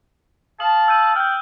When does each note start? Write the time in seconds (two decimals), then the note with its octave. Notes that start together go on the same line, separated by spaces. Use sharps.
0.60 F5 A5 D#6 F#7
0.88 E6 G6 D#7
1.16 G5 F6 G6